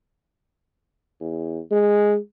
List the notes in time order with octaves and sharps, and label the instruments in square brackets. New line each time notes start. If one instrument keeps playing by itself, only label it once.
[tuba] E2
G#3